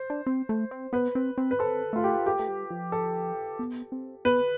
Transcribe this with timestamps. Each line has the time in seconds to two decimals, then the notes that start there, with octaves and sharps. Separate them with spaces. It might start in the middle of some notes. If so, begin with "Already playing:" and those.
Already playing: C5
0.10 D4
0.27 C4
0.49 A3
0.71 C4
0.93 B3 B4
1.15 C4
1.38 C4
1.51 B4
1.59 C4 A4
1.93 A3 F4
2.04 G4
2.26 A3 G4
2.39 A3
2.48 G3
2.71 F3
2.92 A4
3.59 B3
3.92 C4
4.25 B3 B4